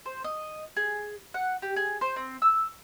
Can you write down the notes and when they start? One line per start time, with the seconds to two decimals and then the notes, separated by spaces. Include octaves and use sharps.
0.06 C5
0.24 D#5
0.76 G#4
1.34 F#5
1.62 G4
1.76 G#4
2.01 C5
2.16 C4
2.42 E6